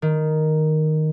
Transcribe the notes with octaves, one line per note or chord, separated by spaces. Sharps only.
D#3